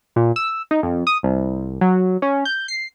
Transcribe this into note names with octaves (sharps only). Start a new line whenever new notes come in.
A#2
E6
D#4
F2
D#6
C2
F#3
C#4
G6
C7